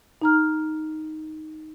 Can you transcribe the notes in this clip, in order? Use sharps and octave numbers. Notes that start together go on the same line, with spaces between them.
D#4 A#5 F6